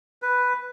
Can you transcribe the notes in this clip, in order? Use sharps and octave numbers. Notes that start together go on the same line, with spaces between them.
B4